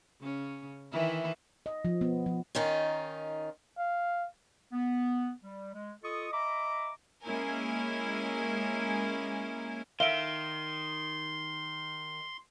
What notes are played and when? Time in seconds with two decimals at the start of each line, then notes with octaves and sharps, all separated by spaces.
0.20 C#3 C#4
0.92 D#3 E3 E4
1.66 D#5
1.85 F3
2.01 B3
2.26 F3
2.55 D#3 C#4 D#4 F4
3.78 F5
4.72 B3
5.42 G3
5.74 G#3
6.04 F4 A4 D#5 C#6 D#6
6.32 D#5 E5 A#5 B5 D6
7.23 G#3 A#3 C#4 E4 A#4 G#5
10.00 D#3 E5 F5 C6 D7 G7